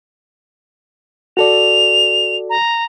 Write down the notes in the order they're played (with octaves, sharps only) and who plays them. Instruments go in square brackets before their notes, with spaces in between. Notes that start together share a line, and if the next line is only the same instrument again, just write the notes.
[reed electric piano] F#4 A4 D5 [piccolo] F7
[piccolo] A#5